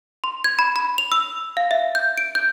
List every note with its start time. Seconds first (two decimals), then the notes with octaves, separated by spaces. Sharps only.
0.24 C6
0.44 G#6
0.59 B5
0.76 B5
0.98 F7
1.12 E6
1.57 F5
1.71 E5
1.95 G6
2.18 D7
2.35 G6